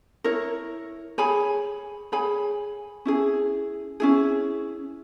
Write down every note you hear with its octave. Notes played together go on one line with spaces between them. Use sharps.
E4 A#4 C#5
G#4 C#5 G#5 B5
G#4 C#5 G#5 B5
C#4 E4 G#4
C#4 E4 G#4